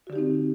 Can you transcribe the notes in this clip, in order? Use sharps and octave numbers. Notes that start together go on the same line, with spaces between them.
D3 C4 D#4 F#4 G4